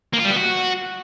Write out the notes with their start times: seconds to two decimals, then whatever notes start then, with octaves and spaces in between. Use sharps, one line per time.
0.13 A#3
0.19 F4
0.24 G3
0.30 B3
0.36 F#4